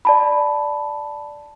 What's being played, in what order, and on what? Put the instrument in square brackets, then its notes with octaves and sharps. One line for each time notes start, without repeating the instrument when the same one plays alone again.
[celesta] D5 A5 B5